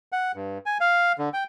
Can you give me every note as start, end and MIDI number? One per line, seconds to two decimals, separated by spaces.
0.12 0.32 78
0.36 0.58 43
0.66 0.78 80
0.81 1.12 77
1.18 1.29 50
1.34 1.44 79